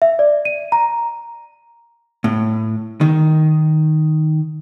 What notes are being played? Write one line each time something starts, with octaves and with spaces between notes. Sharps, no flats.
E5
D5
D#7
A#5
A2
D#3